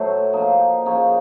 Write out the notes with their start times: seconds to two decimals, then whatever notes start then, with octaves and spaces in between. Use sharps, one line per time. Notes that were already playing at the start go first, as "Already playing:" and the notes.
Already playing: A2 F#3 A3 C5
0.33 F3 A#3 D#4
0.86 C#3 F3 A#3 D#4 C#5